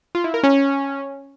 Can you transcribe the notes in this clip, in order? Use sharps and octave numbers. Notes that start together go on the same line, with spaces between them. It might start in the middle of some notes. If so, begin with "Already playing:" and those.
F4
E4
A#4
C#4